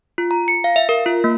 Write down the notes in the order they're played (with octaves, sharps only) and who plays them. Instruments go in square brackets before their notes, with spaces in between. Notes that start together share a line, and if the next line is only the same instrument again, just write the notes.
[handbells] F4
A#5
C#7
F5
E5
A#4
F4
A#3